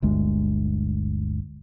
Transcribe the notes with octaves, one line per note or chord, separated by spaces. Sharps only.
G1 D2 G#3